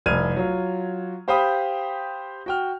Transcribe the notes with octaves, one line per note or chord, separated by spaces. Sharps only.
F1 C2 D5 F6 G#6 D#7
F#3 F4
G4 C5 F5 G5 B5 D#6
F#4 G5 F6